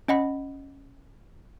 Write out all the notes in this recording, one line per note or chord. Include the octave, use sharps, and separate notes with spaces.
C#4 D#5 F#5 B5